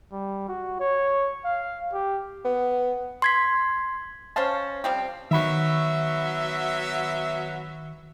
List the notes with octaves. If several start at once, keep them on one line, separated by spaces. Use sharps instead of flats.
G3
F#4
C#5
F5
G4
B3
C6 G#6 B6
C#4 C5 F5 A5
F3 G3 C4
D#3 F#3 B3 E5 B5 C#6